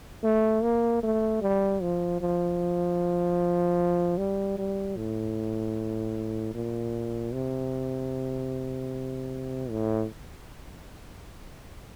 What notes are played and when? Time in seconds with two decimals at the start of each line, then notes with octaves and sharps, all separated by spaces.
0.24 A3
0.63 A#3
1.03 A3
1.42 G3
1.82 F3
2.21 F3
4.18 G3
4.58 G3
4.97 A2
6.55 A#2
7.33 C3
9.70 A2